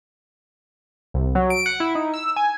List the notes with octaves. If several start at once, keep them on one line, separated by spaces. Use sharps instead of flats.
C2
F#3
D7
F#5
E4
D#4
E6
G#5